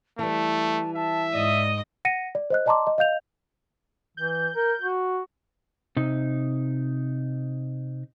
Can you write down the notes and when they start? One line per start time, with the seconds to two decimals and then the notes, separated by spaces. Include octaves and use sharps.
0.19 E3 G3 A3 A5
0.96 E5 A5
1.33 G#2 D5 D#5 D#6
2.05 F#5 A#6 C#7 D#7
2.35 D5
2.50 C5 D#5 F#6
2.66 D5 D#5 A5 A#5 C6 D6
2.87 D#5
2.98 D#5 F5 G6 F7
4.17 E3 G6
4.55 A#4
4.82 F#4
5.97 C3 D#4